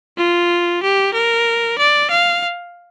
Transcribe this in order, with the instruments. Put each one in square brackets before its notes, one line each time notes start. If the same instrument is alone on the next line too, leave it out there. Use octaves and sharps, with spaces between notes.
[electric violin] F4
G4
A#4
D5
F5